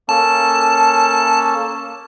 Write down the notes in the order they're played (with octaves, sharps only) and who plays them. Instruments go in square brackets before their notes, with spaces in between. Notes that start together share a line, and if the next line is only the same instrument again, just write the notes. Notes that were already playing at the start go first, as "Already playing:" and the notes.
[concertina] A#3 C#4 A4 [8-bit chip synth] A5